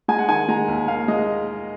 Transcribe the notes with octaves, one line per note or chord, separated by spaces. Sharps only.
G#3 G#5
F#5
D#3 G#5
G#3 A#5
D#2
D#2 F5
G#3 D#5